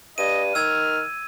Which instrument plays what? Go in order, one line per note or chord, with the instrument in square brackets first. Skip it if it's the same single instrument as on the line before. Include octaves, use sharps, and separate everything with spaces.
[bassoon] G2 [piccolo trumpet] D#5 [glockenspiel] D#7
[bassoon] D#3 [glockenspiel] E6 G#6 [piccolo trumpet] F6